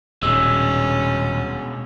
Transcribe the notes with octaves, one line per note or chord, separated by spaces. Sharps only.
D#1 B2 G#3 C#4 E6